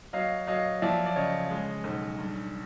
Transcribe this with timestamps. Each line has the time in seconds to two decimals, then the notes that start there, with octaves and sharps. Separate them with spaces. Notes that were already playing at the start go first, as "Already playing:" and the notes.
0.13 F#3 D#5 F5
0.47 F#3 D#5 F5
0.82 F3 D5 E5
1.06 D5
1.16 C#3 C#5 D#5
1.50 G#3
1.84 B1
2.19 G2